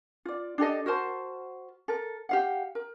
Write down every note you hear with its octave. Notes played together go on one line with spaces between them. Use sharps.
F4 D5
D4 G4 A4 D#5
F#4 A#4 C5 A5
A4 A#4
G4 F5 F#5
A#4